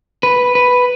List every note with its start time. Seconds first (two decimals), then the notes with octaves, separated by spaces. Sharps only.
0.23 B4
0.55 B4